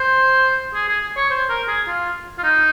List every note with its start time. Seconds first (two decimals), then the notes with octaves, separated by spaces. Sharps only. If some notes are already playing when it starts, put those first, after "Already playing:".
Already playing: C5
0.74 G#4
0.88 G#4
1.17 C#5
1.30 C5
1.49 A#4
1.68 G#4
1.87 F4
2.38 F4
2.43 D#4